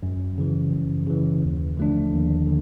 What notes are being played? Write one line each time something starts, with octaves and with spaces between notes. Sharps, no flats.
F#2
C#3 E3
F#2
C#3 E3
D#2
D3 F3 A3 D4
D#2
D3